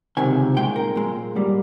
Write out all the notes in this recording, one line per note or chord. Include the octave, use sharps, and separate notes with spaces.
C#2 C3 D#3 G#5
A#2 G#3 G5
A#4
A#2 G#3
G#2 G3 A#3